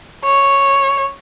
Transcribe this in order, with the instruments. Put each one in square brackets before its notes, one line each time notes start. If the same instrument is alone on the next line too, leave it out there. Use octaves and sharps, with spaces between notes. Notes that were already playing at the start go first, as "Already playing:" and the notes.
[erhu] C#5